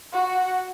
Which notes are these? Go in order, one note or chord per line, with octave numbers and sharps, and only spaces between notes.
F#4